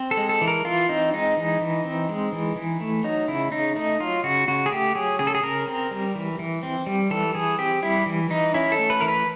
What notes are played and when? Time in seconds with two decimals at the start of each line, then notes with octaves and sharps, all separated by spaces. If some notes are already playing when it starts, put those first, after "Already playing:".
Already playing: C4
0.11 A4
0.17 G#3
0.29 A4
0.41 E3
0.48 A#4
0.65 E3 F4
0.89 C4 D#4
1.13 G#3 D#4
1.37 E3
1.61 E3
1.85 C4
2.09 G#3
2.32 E3
2.56 E3
2.81 A3
3.04 F#3 D#4
3.28 C#3 E4
3.52 C#3 D#4
3.76 A3 D#4
4.00 F#3 F4
4.24 C#3 F#4
4.48 C#3 F#4
4.66 G#4
4.71 A3 G4
4.95 F#3 G#4
5.19 C#3 G#4
5.27 A4
5.35 G#4
5.43 C#3 A#4
5.68 C4
5.91 G3
6.15 E3
6.39 E3
6.63 C4
6.86 G3
7.11 E3 A4
7.35 E3 G#4
7.58 C4 G4
7.82 G3 E4
8.06 E3
8.30 E3 D#4
8.54 C#4 E4
8.72 A4
8.78 A3
8.90 B4
9.01 E3 A#4
9.08 B4